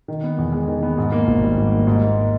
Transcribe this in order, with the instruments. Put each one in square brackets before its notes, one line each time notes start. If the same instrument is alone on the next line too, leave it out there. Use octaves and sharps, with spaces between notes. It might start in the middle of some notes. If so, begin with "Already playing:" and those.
[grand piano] D#3
B3
E2
G#3
D#3
B3
G#2
A#3
G#1
G3
G#2
A#3
G#2
A#3